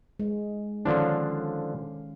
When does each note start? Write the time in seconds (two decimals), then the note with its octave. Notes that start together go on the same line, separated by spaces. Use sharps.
0.19 G#3
0.85 D3 D#3 F3 C#4 D4 F5